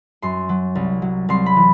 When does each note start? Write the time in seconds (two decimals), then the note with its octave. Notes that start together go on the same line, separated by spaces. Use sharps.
0.22 F#2 C6
0.49 F#3
0.75 C2
1.02 F#3
1.29 C2 C6
1.46 B5
1.56 E3